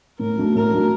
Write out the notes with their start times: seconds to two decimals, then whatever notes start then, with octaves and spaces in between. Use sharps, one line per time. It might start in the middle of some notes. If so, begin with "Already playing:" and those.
0.19 A2 A#4
0.37 F#3 A3 D4
0.55 A2 A#4
0.73 F#3 A3 D4